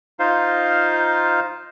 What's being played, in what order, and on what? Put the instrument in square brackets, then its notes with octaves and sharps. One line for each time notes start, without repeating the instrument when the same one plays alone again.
[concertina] D#4 F4 C5 F5